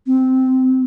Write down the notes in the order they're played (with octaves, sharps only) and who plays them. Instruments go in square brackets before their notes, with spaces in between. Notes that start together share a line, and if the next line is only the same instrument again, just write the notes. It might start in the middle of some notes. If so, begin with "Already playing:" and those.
[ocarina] C4